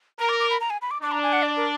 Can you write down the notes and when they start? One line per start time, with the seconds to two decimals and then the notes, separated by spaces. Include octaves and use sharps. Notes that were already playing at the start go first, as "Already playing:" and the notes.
0.19 A#4 A#5
0.29 D6
0.40 D6
0.50 B5
0.60 A#5
0.70 G#5
0.82 B5
0.91 D6
1.02 D4 D6
1.12 A#5
1.23 G#5
1.33 F#5
1.43 D5
1.57 A#4